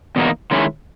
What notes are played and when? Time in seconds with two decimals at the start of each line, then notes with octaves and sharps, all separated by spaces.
0.16 E2 B2 A#3 D#4
0.51 D#3 G#3 C#4 E4